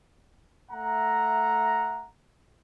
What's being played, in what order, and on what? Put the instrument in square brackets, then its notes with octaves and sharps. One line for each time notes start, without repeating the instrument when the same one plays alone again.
[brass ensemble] A3 E5 F#5 A#5